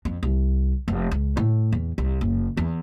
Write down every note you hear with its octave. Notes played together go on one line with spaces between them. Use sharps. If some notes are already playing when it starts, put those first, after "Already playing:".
F2
C2
F1
C#2
A2
E2
C2
F#1
E2